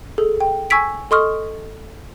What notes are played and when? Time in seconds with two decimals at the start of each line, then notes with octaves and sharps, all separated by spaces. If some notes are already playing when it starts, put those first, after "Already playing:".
0.18 G#4 A4
0.40 G5
0.70 G#5 C#6 E6 G#6 B6 D7
1.11 A4 D#5 C6 C#6 D#6 F6